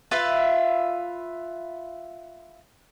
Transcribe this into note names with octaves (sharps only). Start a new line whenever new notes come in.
F4 B4 E5